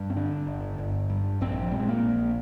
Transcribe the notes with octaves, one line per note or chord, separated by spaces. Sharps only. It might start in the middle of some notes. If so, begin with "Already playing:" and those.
Already playing: G2
C4
D3 D4
G1
G1
G2
A#1 C4
F3
A#2 G3
G#3
A#3
A#1